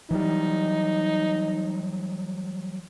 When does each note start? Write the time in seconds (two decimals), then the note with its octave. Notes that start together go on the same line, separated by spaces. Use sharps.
0.11 E3 F#3 G3 D#4